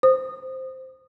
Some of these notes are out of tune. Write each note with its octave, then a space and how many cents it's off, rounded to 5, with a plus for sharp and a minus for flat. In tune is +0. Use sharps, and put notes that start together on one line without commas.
C5 +0 D#6 -20